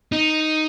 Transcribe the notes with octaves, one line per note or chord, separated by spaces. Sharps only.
D#4